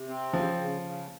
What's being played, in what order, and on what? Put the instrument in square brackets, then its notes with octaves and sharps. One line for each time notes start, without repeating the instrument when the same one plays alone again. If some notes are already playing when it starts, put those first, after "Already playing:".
Already playing: [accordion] C3
C4
[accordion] C#3 [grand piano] F3
[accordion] C#3
C#3